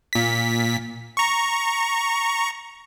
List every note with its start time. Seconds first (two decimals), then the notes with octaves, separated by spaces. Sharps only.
0.13 A#2 B6
1.17 A#5 C#6